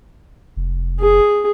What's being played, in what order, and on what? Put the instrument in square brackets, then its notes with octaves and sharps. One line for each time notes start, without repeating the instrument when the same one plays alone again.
[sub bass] F1
[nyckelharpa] G#4